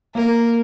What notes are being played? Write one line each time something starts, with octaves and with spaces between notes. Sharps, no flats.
A#3 A#4